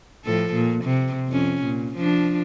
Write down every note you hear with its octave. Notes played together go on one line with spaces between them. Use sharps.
A2 F3 A4
A#2
C3
F2 C#4
A#2
F3 D4